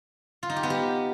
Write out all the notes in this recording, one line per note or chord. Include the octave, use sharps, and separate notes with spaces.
F4
D#4
G4
B3
G4